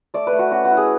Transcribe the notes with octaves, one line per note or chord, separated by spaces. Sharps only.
A3 D5
B4
A3
F#4
C#4 F#4
F#4
E4
G#4